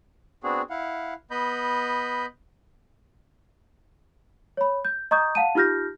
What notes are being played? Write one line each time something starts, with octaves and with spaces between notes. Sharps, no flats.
B3 C4 D4 F#4 G#4
E4 F5 F#5
B3 D#5 B5 G6
C#5 B5
G6
D#5 A#5 C#6 D#6 G6
F5 F#5 A5 D#7
D#4 F4 G4 F6 G6 A#6